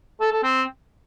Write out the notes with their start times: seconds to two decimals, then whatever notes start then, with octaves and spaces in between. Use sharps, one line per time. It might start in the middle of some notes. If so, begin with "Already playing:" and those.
0.21 A4
0.32 A4
0.43 C4